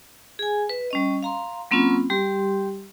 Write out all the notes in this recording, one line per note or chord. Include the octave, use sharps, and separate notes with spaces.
G#4 G#5
B4
G3 C#4 D#5
F5 A#5 C6
F#3 A#3 C4 C#4 F4 B5
G3 G4 C6